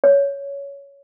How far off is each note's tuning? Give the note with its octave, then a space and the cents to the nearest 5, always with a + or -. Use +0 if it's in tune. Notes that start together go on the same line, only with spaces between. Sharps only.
C#5 +15